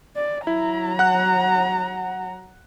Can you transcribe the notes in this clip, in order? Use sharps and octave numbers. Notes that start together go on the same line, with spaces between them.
D5
F#3 E4 A#5
F#5 F#6